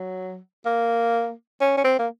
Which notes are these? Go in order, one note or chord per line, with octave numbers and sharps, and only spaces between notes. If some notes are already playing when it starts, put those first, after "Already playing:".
Already playing: F#3
A#3
C#4
C#4
C4
A#3